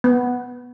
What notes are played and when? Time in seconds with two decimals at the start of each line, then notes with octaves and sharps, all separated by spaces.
0.04 B3